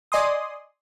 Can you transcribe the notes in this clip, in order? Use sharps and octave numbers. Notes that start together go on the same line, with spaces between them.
D5 D#5 G#5 C6 D#6